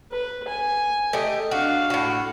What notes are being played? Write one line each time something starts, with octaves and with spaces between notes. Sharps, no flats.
B4
G#5
A3 G4 D#5
D4 F#4 F5
A2 F#4